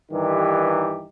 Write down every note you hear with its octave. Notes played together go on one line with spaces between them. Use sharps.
G2 D#3 E3 D#4 G4